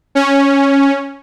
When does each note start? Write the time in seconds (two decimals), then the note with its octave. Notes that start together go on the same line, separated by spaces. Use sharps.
0.15 C#4